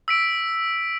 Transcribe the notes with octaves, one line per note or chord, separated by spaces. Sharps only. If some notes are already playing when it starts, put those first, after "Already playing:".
E6 B6 D7